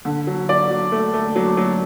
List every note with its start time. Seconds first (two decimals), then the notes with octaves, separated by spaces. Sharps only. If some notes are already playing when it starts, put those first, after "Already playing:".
0.05 D3
0.27 F#3
0.49 F#3 D5
0.70 F#3
0.92 A3
1.14 A3
1.36 F#3
1.57 F#3